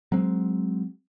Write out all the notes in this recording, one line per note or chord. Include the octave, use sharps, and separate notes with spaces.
F#3 G#3 C4